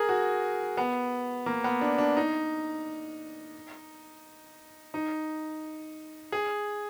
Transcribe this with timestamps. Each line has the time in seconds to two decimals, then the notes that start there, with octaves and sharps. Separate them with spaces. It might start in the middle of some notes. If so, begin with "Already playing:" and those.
Already playing: G#4 A#4
0.09 F#4
0.77 B3
1.46 A#3
1.64 B3
1.81 D4
1.98 D4
2.17 D#4
4.94 D#4
6.32 G#4